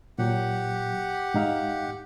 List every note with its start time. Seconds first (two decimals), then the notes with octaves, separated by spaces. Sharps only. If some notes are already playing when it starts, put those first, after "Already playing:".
0.18 A#2 F#3 G4 F#5
1.34 G#2 D#4 F5